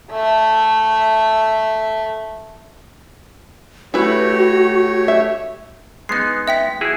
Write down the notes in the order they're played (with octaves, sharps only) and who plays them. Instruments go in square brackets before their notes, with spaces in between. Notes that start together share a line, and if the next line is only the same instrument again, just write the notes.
[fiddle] A3 E5
[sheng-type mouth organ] A3 G4 C#5 [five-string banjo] E4 B4 [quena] F#4
[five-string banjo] E5
[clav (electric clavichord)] G#3 B3 D#4 [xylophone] F#6 C7
[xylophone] E5 G5 B6
[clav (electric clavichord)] E4 F#4 G#4